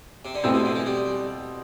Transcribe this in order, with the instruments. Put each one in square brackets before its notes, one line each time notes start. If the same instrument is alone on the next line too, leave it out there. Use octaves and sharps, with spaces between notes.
[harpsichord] C3
D3
[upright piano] B2 A3 C4 E4 [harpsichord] E3
[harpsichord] C3
D3
E3
G3